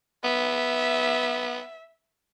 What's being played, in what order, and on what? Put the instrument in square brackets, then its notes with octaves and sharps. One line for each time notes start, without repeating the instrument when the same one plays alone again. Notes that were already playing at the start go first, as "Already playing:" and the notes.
[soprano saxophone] B3 [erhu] E5